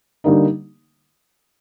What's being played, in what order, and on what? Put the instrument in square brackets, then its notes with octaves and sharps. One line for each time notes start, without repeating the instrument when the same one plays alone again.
[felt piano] D3 G3 A#3 D#4